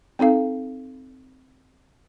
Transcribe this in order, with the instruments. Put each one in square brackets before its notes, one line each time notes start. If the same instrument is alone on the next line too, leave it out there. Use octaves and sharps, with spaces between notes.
[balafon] C4 D#4 A4 F5